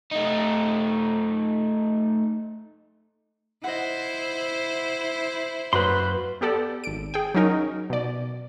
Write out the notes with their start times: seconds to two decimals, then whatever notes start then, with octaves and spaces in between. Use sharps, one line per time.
0.12 A3 D#4
3.64 E4 C5 D#5 F#5
5.73 F#2 A#3 F#4 B4 C6
6.41 B3 G4 A4 D5
6.84 G#1 D7
7.14 G#4 G5
7.34 F#3 C#4 D#4 A#4
7.90 B2 D5